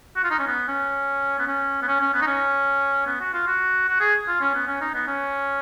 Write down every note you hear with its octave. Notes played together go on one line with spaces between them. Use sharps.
F#4
F4
D#4
C#4
B3
C#4
B3
C#4
B3
C#4
C#4
B3
D#4
C#4
B3
F#4
F4
F#4
F#4
G#4
F4
C#4
B3
C#4
D#4
B3
C#4